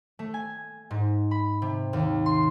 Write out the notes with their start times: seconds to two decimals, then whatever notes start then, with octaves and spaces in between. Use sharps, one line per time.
0.19 A3
0.34 G#5
0.91 G#2
1.31 B5
1.62 C3
1.93 D#2
2.26 C6